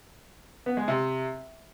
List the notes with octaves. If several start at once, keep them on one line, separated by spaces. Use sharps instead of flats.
B3
G#3
C3